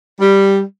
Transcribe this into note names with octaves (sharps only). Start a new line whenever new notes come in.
G3